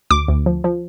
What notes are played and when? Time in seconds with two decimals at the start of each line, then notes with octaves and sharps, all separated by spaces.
0.10 D2 D6
0.28 D2
0.46 F3
0.64 F3